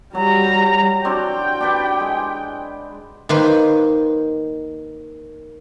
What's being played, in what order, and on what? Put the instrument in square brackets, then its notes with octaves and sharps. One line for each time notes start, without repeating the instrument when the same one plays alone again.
[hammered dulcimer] F#3 [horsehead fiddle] G3 A#5
[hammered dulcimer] C4 D4 F#4 [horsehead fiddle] G5
[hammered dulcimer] D4 G4 B4
G#3
[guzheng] D#3 A#3 B4 C5